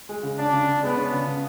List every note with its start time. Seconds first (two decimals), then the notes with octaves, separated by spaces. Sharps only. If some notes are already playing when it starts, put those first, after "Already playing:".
0.09 G#3
0.23 C#3
0.38 C#3 D4
0.53 C#3
0.68 C#3
0.83 G#3 B3
0.97 C#4
1.13 C#3
1.27 C#3